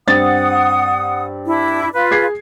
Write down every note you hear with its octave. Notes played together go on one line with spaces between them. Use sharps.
G2 C4 F#5 D#6 A6
D4 E4
F4 B4
G#4 G#6 C7